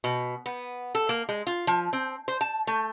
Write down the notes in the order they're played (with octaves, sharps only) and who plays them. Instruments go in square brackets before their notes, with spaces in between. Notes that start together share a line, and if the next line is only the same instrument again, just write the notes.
[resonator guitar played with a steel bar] B2
B3
A4
A#3
G#3
F4
F3
C4
C5
A5
A3